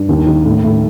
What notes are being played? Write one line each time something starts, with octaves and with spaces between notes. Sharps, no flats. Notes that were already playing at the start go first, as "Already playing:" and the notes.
Already playing: G2
D#2
D#3
A2
A2